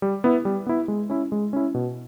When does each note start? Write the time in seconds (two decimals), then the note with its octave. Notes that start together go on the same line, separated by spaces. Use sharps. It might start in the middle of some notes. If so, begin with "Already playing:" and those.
0.02 G3
0.24 B3 E4
0.45 G3
0.66 B3 E4
0.88 G#3
1.10 C#4 E4
1.32 G#3
1.53 C#4 E4
1.74 B2